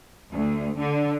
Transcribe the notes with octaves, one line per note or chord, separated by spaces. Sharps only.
D2
D3